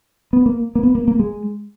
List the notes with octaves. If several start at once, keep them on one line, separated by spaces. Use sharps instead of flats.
B3
A#3
A#3
B3
A#3
A#3
G#3